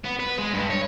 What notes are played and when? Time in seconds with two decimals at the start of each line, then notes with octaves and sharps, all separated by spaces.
0.04 B3
0.19 B4
0.38 G#3
0.53 G2
0.70 C#5